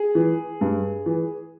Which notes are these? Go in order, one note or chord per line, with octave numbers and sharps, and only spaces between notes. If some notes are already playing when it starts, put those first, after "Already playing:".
Already playing: G#4
E3
G2
E3